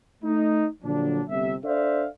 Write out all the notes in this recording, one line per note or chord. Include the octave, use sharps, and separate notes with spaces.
A3 D#4
A#2 D3 F3 F#3 D4
G1 C3 E5
D4 A4 C5 D5 E5 F5